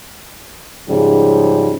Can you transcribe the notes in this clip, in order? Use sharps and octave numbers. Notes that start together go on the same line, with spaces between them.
G#2 C#3 F3 G3